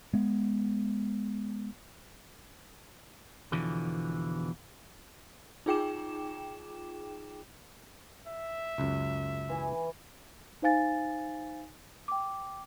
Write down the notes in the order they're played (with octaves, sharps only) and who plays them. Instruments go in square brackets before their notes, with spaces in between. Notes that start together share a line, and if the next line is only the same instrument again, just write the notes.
[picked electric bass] G#3 B3
[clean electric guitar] E2 B2 D3 E3 F3
[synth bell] D#4 F4 G#4 G5 D6 E7
[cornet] E5
[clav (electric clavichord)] C#2 F#2
[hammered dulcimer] E3 G#5
[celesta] D#4 C5 F5 G#5 A6
G5 D6